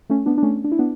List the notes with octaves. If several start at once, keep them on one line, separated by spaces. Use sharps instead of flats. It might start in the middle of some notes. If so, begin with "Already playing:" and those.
A3 C#4
B3 D4
D4
A3 C#4
D4
E4
B3 D4